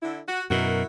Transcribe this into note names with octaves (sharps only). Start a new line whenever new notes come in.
D3 E4
F#4
F#2 B2 E4 F#4 A#4